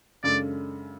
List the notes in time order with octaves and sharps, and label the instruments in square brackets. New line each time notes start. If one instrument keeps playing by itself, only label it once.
[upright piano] F#2 C#3 G#3 D4 A4 [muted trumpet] D5